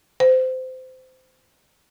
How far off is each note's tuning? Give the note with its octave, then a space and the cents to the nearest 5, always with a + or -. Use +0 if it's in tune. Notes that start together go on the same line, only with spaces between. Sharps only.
C5 -25